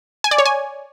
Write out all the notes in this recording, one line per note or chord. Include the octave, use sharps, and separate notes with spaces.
G#5
D5
C#5
G#5